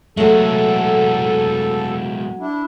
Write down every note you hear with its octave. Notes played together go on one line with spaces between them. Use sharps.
F#3 G#3 A3 B3 A4
D4 E4